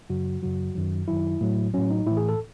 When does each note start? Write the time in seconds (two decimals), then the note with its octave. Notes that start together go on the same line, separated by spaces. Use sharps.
0.10 F#2 C#3 F#3 F#4
0.43 F#2 C#3 F#3 F#4
0.75 F#2 D#3 F#3
1.08 F#2 D#3 F#3 E4
1.41 A2 F#3
1.74 A2 F#3 C#4
1.90 D#4
2.07 A2 E3 E4
2.17 G#4
2.29 A4